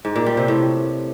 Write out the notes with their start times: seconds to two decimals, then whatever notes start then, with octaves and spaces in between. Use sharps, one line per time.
0.05 G#2
0.16 A#2
0.26 G3
0.37 C3
0.48 A2